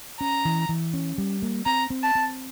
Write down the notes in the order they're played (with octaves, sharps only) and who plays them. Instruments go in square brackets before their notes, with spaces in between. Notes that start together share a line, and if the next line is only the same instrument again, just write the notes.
[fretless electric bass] C#4 [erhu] A#5
[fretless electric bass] E3
E3
C#4
G3
A#3
[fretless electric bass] C4 [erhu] A#5
[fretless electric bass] C4
[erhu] A5
[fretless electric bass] C4